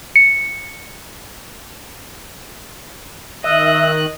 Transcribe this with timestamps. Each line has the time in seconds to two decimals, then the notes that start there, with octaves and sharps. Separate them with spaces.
0.16 C#7
3.44 D#3 D#5 E5 F#6